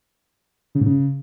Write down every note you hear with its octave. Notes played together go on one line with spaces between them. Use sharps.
C#3
G#2
C#3